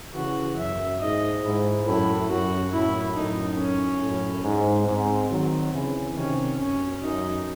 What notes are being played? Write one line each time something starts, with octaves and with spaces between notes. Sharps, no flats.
C#3 E3 F#4
F#2 E5
G#2 D#5
G#2 E4
F#2 A2 E4
F#2 F#4
F#2 A2 E4
F#2 A2 D#4
C#4
F#2 A2
G#2
G#2 C4
D#3 F#3
C#3 E3
C3 D#3 C#4
F#2 C#4
F#2 D#4